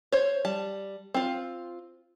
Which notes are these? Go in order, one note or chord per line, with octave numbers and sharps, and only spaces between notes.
C5 C#5
G3 A5
C4 F4